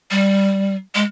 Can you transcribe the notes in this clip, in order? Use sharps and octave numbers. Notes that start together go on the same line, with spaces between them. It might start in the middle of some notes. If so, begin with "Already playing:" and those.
G3
G#3